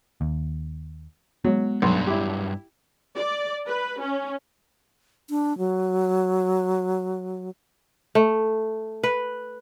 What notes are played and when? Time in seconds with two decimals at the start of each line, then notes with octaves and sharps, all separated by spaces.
0.21 D#2
1.45 F#3 G#3 B3
1.82 B1 G2 F#3
2.07 E4 G4
3.16 D5
3.67 B4
4.00 C#4
5.30 D4
5.58 F#3
8.15 A3
9.03 B4